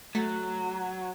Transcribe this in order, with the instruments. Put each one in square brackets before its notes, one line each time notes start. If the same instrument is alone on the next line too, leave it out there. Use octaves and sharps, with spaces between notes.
[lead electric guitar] F#3 [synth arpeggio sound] A3